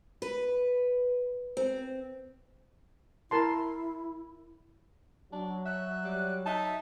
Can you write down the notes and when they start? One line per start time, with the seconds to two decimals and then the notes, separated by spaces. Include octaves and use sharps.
0.22 B4
1.57 C4
3.31 E4 A#4 A5 C6
5.32 F#3 D4
5.66 E5 F#6
6.04 G3
6.46 D#4 E5 A5